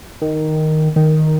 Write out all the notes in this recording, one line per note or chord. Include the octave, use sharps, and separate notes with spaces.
D#3
D#3